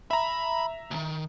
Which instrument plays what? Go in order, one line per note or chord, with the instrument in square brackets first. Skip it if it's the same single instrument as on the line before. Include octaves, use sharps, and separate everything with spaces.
[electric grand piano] E5 A#5 [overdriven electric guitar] B5
[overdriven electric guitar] D2 D#3